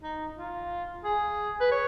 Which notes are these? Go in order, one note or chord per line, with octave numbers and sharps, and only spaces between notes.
D#4
F4
G#4
B4
C#5